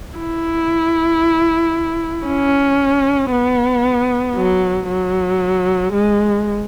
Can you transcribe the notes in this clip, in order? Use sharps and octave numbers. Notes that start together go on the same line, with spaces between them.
E4
C#4
B3
F#3
F#3
G#3